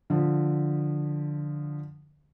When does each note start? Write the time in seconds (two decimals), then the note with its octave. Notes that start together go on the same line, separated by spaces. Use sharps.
0.10 D3 F3